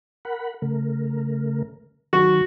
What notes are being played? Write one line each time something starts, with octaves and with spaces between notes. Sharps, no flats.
A#4 F#5 B5
C#3 A3 A#4
D#3 F#3 F#4